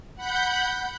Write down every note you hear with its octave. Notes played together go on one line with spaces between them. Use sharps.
F#5 B5 G6